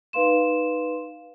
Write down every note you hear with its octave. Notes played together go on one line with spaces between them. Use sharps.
D#4 B4 F5 C6 E7